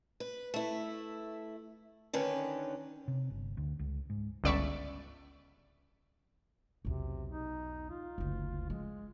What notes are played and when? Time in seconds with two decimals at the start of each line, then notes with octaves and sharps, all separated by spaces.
0.20 B4
0.54 A3 E4
2.13 D3 D#3 C#4 B4
3.08 C3
3.30 G1
3.57 D2
3.79 C#2
4.10 G#2
4.44 G1 C#2 D5 E5 B5 C#6
6.85 B1 E2 C3
7.29 D#4
7.90 F4
8.18 F#1 D2
8.70 F3 G#3